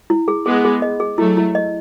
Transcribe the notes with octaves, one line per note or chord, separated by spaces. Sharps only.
E4
G#4
G#3 B3 G#4
G#4
D#5
G#4
F#3 A3 E4
E4
D#5